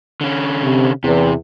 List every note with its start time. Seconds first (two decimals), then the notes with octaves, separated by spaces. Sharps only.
0.21 D3 C#4
0.63 C3
1.04 E2 C3